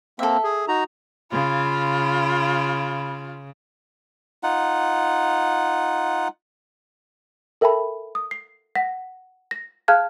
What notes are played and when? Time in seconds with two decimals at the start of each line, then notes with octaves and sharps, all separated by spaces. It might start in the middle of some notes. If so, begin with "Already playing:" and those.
0.19 A#3 C4 A4 E5
0.44 G#4
0.68 D#4 F#4 A#5
1.31 C#3 F4 B5
4.43 D#4 F4 F#5
7.61 A4 A#4 E5 G5 A5 B5
8.15 D#6
8.31 C7
8.75 F#5 A#6 B6
9.51 A#6
9.88 G#4 F5 A5 F6 F#6 G#6